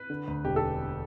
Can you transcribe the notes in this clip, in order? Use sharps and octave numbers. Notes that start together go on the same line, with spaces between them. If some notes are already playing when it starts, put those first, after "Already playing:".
Already playing: B4
D3
D2
E1 G4
A4